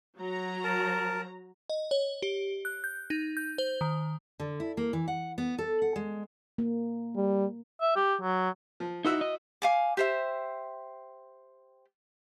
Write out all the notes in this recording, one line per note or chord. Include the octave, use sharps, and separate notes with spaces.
F#3 A#5
A#4 A5
D#5
C#5
G4
F#6
G6
D#4
G6
C5
D#3
D3
E4
A#3
E3
F#5
B3
A4
F#5
G#3
A#3
G3
E5
G4
F#3
F3
D#4 E4 F#4 E5
D#5
F5 G#5 D6
G4 C5 E5